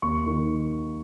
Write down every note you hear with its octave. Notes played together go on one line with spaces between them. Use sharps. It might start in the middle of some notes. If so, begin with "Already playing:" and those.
D#2 C#6
D#3